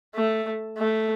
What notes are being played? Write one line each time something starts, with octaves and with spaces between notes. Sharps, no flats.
A3
A3